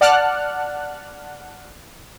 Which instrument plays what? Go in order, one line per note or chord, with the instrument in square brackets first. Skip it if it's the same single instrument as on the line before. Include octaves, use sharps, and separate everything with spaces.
[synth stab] D5 F#5 A5 F6 F#6